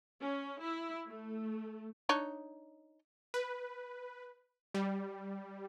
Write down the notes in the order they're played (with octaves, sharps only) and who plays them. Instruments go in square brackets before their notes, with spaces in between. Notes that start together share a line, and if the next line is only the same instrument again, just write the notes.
[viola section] C#4
E4
A3
[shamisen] D4 D#4 C#5
[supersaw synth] B4
G3